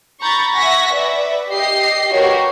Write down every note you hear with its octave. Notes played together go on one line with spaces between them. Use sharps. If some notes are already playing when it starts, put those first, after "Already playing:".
A#5 B5 C#6 G6 A6
E5 F#5 G#5 C#6 A#6 B6
B4 D5 E5
G4 D#5 C7
F#4 G4 A#4 B4 C#5